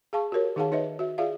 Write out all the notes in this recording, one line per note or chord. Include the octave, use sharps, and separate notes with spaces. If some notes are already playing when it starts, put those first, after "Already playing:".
G#4 F5 A5 C#6
F#4 G4 A#4 C#5
D#3 D#4 G#4 F5 F#5 A5
D#4 B4 C#5 D#5 E5
F#4 E5
F4 G#4 D5 E5 F5